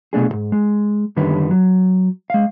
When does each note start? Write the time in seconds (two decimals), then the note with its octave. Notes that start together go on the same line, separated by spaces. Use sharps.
0.13 C2 B2 A3 D4 G#4
0.29 D#2 G#2
0.52 G#3
1.16 F#2 D3 D#3 G3 B4
1.51 F#3
2.30 G#3 F5